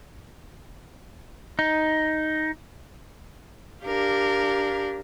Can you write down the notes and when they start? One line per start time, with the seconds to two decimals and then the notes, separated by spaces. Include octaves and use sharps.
1.59 D#4
3.85 D4 G4 A#4 F5